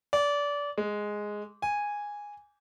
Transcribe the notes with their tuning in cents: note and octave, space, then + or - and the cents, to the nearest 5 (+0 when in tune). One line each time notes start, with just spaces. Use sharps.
D5 -25
G#3 +0
G#5 -10